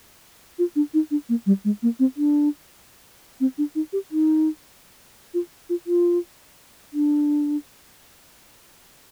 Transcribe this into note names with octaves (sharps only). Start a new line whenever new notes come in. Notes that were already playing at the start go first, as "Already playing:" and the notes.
F4
D4
D#4
D4
A#3
G3
G#3
A#3
C4
D4
C4
D4
D#4
G4
D#4
F4
F4
F4
D4